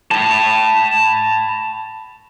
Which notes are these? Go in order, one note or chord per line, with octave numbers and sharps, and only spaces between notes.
A5 B5